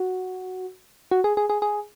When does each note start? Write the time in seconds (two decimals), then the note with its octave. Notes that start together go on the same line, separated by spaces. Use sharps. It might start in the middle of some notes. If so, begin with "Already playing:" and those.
Already playing: F#4
1.11 F#4
1.24 G#4
1.37 G#4
1.49 G#4
1.62 G#4